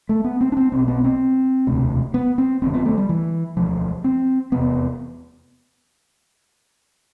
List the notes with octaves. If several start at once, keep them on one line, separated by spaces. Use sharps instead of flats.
A3
B3
C4
D4
C4
B1 B2 C4
B3
C4
E1 D2 C3
B3
C4
G1 F2 D3 C4
B3
A3
G3
E3
E1 D2 D3 F3
C4
F1 E2 C3 B3